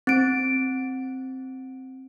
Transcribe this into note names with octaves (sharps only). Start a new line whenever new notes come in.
C4 D7